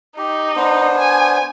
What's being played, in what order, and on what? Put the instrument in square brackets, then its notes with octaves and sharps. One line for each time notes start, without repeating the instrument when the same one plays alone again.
[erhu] D#4 [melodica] G4
[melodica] B3 D4 C5
[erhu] G#5